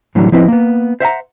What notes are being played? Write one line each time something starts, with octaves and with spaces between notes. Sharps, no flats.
A2 D3 E3 F#3 G3
F3 C4 E4 B4 D#5
A#3 B3
C5 E5 F#5 A#5